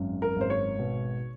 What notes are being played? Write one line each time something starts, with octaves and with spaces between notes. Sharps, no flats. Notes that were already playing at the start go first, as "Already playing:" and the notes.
Already playing: G#1 F#2
A#4
G#1 C5
C#5
B2